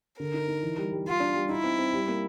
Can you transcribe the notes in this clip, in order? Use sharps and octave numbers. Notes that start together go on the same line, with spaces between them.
D3 A#4
D#4
D#4
E3
G3
G3
G3 F4
D4
G3
D#4 E4
C4
C4
G3
A#3